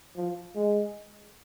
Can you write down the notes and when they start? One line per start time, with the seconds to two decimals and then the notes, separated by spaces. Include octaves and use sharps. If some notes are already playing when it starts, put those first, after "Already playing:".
0.16 F3
0.56 G#3